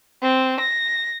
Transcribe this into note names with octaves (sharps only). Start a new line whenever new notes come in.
C4
A#6